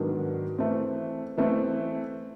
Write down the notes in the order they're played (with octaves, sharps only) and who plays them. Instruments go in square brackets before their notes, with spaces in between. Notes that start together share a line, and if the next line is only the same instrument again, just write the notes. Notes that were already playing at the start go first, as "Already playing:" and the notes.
Already playing: [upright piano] G#2 D#3 F#3 B3 D4
E3 A3 C4
E3 A3 C4